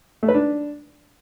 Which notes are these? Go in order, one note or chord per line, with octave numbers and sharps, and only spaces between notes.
A3
B4
D4